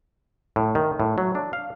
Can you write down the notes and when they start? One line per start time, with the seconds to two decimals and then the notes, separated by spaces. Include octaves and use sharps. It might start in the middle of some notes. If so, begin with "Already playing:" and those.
0.56 A2
0.75 D#3
1.00 A2
1.18 F#3
1.35 D4
1.53 F5